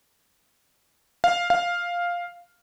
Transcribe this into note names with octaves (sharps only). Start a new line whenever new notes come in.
F5
F5